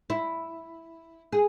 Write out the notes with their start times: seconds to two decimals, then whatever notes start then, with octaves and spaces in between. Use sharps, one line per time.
0.10 E4
1.32 G#4